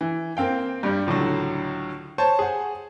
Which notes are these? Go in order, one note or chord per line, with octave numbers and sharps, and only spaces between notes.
E3
A#3 C4 F5 G5
G2 G3
C#2 A2 D3 F#3
C5 C#5 A5
G#4 F#5